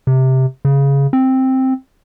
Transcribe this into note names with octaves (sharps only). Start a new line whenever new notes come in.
C3
C#3
C4